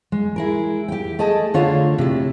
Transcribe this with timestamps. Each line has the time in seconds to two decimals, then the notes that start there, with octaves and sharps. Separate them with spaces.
0.12 G#3
0.36 E4 G#4 A#4
0.88 G4 G5
1.19 A3 G#4 A4 D#5 A5
1.54 D3 A3 D4 F4 C#5 A#5
1.98 C3 E4